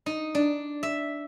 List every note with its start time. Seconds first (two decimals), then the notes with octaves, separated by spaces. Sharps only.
0.06 D#4
0.35 D4
0.83 E5